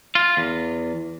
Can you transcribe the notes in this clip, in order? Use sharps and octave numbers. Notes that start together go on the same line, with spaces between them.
F4
E2